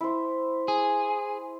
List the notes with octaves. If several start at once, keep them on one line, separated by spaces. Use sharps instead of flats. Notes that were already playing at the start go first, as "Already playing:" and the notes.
E4 C5
G#4